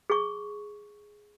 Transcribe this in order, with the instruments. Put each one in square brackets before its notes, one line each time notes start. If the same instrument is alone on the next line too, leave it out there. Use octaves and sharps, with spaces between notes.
[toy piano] G#4 C#6